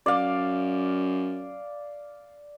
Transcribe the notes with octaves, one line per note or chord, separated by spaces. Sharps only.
F#2 D5 F5